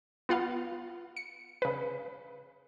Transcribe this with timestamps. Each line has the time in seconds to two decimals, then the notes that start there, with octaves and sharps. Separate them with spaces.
0.29 B3 F4 F5 F#5
1.17 C#7
1.62 C#3 B4